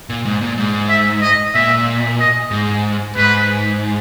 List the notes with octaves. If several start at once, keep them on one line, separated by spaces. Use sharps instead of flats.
A#2
G#2
A#2
G#2
E5
D#5
A#2 E5
D#5
G#2
G#2 B4